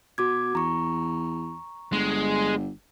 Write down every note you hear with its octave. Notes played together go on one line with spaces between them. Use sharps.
B2 F#4 D6 G#6
E2 A#5 C#6
G1 G#3